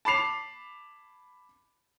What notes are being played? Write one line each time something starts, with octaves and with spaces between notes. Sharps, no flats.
A5 B5 D6 C7 F7